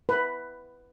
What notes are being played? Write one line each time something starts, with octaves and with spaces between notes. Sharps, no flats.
B4